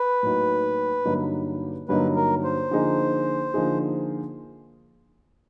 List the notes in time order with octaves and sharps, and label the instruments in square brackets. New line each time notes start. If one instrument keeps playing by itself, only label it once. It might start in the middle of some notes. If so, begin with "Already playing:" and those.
Already playing: [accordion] B4
[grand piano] A2 F#3 A#3 D#4 F#4
G2 D3 F#3 A#3 D#4
[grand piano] G2 D3 F#3 A#3 D#4 [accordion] B4
[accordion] A#4
C5
[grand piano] D3 F3 A#3 D#4 G#4
D3 F3 A#3 D#4 G#4